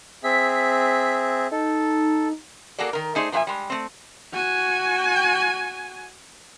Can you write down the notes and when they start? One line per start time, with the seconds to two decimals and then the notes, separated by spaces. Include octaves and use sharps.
0.24 C4 G#4 E5 B6
1.51 D#4 A4
2.79 A#3 F#4 G#4 A4 D5
2.93 D#3 A#4
3.15 A3 D#4 G#4 C5 D5
3.32 A#2 F3 D4 F4 E5 G#5
3.47 G3 G#3
3.70 A3 C4
4.33 F#4 G#5